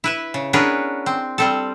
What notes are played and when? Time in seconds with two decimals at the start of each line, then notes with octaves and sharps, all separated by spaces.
0.04 E4 B4 E5
0.34 C#3
0.53 B3 C#4 D4 G#4 A#4 B4
1.06 C4
1.38 G3 C4 A4